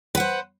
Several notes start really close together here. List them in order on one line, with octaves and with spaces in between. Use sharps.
B4 F#5 C5